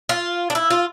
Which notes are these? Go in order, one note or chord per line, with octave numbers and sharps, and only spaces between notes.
F4
D4
E4
F4